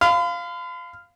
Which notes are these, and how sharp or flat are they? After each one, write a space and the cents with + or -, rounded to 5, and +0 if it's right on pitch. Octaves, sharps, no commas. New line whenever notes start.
F5 -5 B5 +45